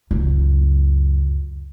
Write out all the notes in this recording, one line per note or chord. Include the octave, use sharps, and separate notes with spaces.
C#2 F#2